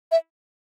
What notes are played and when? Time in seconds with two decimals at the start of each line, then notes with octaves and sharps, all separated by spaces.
0.12 E5